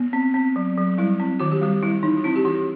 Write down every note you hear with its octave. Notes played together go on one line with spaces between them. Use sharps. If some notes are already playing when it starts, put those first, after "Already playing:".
Already playing: B3
C4
C4
F#3
F#3
G3 E4
C4
D#3 F#4
G4
G3 F#4
G3 E4
E3 D#4
F#4
C4 E4
G4
E3 F#4